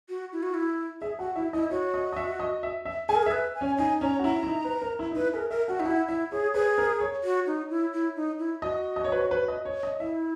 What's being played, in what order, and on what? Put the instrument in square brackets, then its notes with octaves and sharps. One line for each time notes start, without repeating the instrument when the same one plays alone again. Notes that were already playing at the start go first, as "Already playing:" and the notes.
[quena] F#4
E4
F#4
E4
[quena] G#4 [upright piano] E5
[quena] F#4 [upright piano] F#5
[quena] E4 [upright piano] E5
[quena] E4 [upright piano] D#5
[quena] F#4 [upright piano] C#5
[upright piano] D#5
D#5
E5
D#5
E5
E5
[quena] G#4 [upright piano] G#5
[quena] A#4
G#4
[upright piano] E5
[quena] B4
G#5
[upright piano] C#4
[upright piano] D#4 [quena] G#5
[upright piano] C#4 [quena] A#5
[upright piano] F#4
[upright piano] E4 [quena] A#5
[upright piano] E4
D#4
B4
A#4
E4
D#4
[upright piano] E4 [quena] B4
[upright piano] G#4 [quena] A#4
[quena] A#4 [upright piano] E5
[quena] F#4 [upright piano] F#5
[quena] D#4 [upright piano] E5
[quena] E4 [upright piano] F#5
[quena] E4 [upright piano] E5
[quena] G#4 [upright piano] C#5
[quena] G#4 [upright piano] B4
[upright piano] A#4
C#5
[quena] F#4
D#4
E4
E4
D#4
E4
[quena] F#4 [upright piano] D#5
[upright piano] D#5
C#5
B4
C#5
B4
D#5
C#5
D#5
[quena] E4 [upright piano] E5